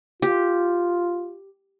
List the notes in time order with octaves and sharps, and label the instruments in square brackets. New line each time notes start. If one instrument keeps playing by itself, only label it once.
[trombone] F4 [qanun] G4